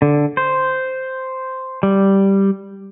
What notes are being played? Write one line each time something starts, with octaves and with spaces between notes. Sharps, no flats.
D3
C5
G3